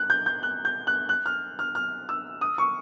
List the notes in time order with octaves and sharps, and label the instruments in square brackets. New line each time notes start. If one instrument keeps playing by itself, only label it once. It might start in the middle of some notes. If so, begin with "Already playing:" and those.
Already playing: [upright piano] F#6
G6
G6
F#6
G6
F#6
F#6
F6
F6
F6
E6
D#6
C#6